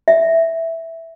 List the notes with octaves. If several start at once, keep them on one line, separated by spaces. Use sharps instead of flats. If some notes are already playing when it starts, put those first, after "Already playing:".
E5